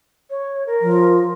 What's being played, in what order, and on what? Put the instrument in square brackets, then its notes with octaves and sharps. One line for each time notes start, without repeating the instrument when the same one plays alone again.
[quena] C#5
A#4
[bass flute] F3